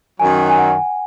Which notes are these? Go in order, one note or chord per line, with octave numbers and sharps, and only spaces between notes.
F#2 D#3 F#3 G#5
G#5
F#5